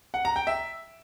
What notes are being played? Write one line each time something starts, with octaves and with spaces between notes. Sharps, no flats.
F#5
A#5
G5
E5